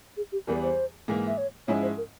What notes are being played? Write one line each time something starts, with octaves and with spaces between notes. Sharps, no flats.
G#4
G4
E2 E3 G3 A#4
C5
G#2 E3 A#3
E5
C#5
G#2 F3 G#3 C#4 E4 C#5
C5
A#4